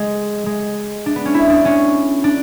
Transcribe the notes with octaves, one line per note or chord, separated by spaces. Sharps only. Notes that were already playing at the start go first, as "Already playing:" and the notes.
Already playing: G#3
G#3
D4
B3
C#4
E4
D4
C#4
D4